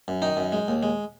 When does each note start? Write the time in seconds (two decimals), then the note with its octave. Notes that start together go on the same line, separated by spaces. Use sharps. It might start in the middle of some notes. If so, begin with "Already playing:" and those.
0.08 F#2
0.22 D#3 D#4
0.37 F#2
0.52 G#3
0.68 D#2
0.83 G#3